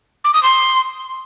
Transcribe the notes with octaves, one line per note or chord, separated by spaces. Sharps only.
D6
D#6
C6